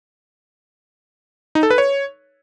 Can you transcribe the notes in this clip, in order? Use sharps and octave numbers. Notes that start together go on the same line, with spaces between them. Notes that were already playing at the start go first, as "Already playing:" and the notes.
D#4
A4
B4
C#5